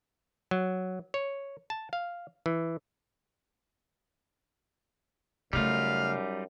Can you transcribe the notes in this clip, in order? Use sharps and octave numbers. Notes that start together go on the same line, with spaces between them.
F#3
C#5
A5
F5
E3
F#2 C#3 G3 A3 D#4 F4 F5